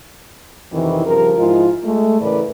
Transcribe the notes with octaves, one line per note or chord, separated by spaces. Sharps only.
F2 C3 D#3 E3
G2 C#3 F3 G4 A#4
G#2 F3 G#3 E4 F4
G#3 A3
A2 C#3 E3 A#4 B4 D5